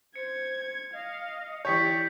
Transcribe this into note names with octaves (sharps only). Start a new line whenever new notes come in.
C5 G#6 C#7
D#5 F5
E3 E4 G4 C#5 D5 G6 B6 C#7